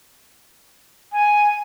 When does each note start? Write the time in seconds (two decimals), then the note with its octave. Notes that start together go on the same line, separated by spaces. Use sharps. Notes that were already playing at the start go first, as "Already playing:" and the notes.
1.12 G#5